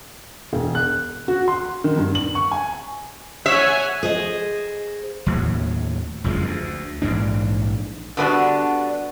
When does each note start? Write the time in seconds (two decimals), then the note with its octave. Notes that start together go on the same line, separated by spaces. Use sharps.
0.53 E1
0.75 F#6
1.28 F#4
1.48 C6
1.84 D#3
1.97 G2
2.15 F#7
2.35 C#6
2.52 G#5
3.46 C#5 E5 F#5 G#5
4.03 G#4 C5 D#5
5.26 D#2 A2 F#3
6.24 F#1 F2 F3 G#3
6.44 D2
7.02 A#1 G#2 E3 D4
8.17 D3 G3 B3 C#4 D4 F#4